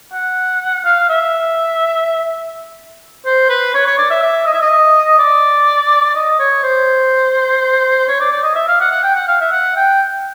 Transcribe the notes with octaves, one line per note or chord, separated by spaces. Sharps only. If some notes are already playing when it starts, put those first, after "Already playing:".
F#5
F5
E5
C5
B4
C#5
C#5
D5
E5
E5
D#5
E5
D#5
D5
D#5
C#5
C5
C#5
D5
D5
D#5
E5
F5
F#5
F#5
G5
F#5
F5
E5
F#5
G5